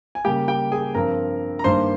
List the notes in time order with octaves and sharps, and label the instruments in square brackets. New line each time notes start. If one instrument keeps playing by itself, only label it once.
[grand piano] G#5
C#3 G3 A#3 G4 G5
G4 G5
G#4 G#5
G2 F3 C4 A#4 A#5
A#5
G2 D#3 G3 A#3 C5 C6